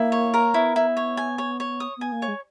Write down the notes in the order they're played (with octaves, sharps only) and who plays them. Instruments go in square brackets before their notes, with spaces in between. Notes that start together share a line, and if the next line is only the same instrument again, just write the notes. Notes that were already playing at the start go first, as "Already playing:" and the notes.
Already playing: [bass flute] A#3 [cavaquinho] E4
[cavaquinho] C#5
A#4
[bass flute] B3 [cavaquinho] E4
[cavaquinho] E4
C#5
G#5
C#5
C#5
D#6
[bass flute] B3 [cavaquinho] G#5
[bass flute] A#3
[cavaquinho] C#5
[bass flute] G#3